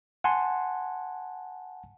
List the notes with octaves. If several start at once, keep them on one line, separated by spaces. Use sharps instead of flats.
F#5 G#5 A5 C6